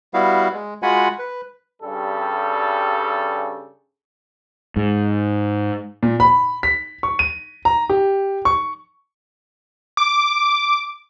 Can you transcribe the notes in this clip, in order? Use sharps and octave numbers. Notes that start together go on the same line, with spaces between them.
G3 B3 E4 F#4 F5
G#3
G#3 F4 F#4 F#5 G#5 B5
B4
G2 C#3 G3 A4
G#2
A#2
B5
B6
C#6
D#7
A#5
G4
C#6
D6